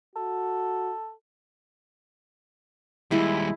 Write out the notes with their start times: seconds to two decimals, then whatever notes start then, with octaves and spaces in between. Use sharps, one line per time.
0.16 F#4 A4
3.11 D#2 G3 G#3 E4